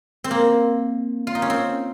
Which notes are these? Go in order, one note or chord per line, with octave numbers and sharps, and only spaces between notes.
C4
A#3
F4
D#4
C#4
C4